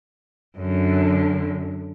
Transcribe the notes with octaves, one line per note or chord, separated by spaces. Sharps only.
F#2 D3